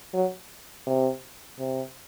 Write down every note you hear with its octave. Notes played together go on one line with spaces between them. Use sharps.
F#3
C3
C3